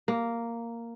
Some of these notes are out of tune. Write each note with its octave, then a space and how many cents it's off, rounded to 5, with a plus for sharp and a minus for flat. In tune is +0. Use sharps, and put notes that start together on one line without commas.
A#3 -5